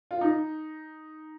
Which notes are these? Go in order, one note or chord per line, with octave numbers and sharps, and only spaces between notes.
F4
D#4